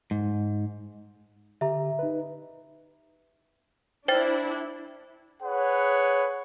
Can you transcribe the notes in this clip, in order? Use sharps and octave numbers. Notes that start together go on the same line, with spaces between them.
G#2
D3 G4 E5 A#5
D#4 B4
D4 E4 C5 G5 A6
G#4 B4 C#5 F#5